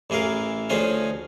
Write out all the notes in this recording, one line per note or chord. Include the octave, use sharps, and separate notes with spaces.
A1 E3 G#4 A#4 F5
D2 F3 C#4 G#4 D#5 F5